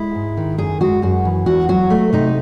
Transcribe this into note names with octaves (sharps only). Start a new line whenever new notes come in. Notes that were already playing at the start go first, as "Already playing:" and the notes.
Already playing: G#3 E4
G#2
D#3
F#2 G#4
G#3 F#4
F#2 F#4
E3
E2 F#4
F#3 F#4
A3
C3 D#4